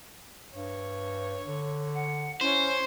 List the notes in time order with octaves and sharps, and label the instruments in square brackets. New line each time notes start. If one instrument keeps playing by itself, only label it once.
[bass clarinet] G2 [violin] C#5
[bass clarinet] D3
[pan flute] F#5
[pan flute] C#4 [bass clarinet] E4 [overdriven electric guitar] C5 [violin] C#5 C6